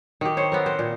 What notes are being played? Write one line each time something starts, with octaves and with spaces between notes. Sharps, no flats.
D#3 G4
C5 C#5
B3 C4 A#4
C5
A#2